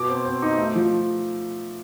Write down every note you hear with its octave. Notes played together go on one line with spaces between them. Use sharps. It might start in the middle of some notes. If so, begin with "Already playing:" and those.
Already playing: B2 D6
C4
C4
D#4
A3
F3